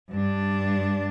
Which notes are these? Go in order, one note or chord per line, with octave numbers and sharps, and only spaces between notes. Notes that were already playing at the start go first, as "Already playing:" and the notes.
G2 D4